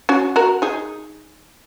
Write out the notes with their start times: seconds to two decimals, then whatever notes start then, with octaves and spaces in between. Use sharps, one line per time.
0.09 C#4 F#4
0.36 F#4 A#4
0.62 D#4 G#4